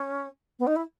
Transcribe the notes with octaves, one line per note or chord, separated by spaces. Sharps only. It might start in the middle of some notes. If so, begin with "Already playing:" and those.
Already playing: C#4
B3
D#4
E4